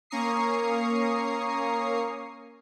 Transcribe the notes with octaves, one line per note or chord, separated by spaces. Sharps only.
A#3 C#4 A#5 C#6 D#6 C7